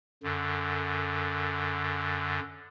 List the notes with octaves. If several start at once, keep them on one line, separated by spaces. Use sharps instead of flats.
F#2 D3